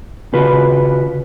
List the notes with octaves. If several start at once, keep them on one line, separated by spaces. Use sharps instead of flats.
C#3 F4 F#4 B4